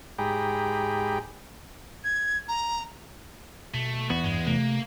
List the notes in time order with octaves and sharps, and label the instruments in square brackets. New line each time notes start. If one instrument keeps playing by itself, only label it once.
[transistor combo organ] G#2 G4 G#4 G5 A#5 B5
[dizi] G#6
A#5
[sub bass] B2 [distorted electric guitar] A3
[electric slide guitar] E2 B3 [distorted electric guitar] F#4
[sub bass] G2 [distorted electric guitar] G#3
[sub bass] C3 [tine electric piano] A3 [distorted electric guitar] A#3